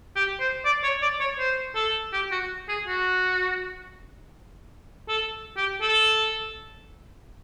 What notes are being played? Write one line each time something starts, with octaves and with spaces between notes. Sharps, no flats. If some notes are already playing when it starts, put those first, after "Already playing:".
G4
C5
D5
C#5
D5
C#5
C5
A4
G4
F#4
G#4
F#4
A4
G4
A4